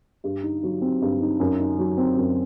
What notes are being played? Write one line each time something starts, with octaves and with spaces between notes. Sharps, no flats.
G2
D#4
F#3
C4
G2
D#4
F#2
D#4
F#3
C4
F#2